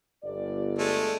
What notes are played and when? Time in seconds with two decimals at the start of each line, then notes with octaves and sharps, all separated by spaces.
0.24 G1 D5
0.79 G#3 A3